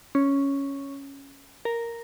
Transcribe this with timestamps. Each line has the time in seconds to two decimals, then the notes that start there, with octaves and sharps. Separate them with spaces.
0.15 C#4
1.65 A#4